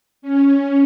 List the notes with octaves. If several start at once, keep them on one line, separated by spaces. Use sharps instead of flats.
C#4